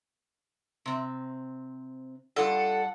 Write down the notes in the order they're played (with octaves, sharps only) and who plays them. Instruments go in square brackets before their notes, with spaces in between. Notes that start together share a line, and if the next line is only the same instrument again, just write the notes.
[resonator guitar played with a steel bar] C3 C4
[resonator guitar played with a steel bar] G2 F4 D5 [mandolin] A4 [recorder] F#5